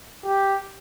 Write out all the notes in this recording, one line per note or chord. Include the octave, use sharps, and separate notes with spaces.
G4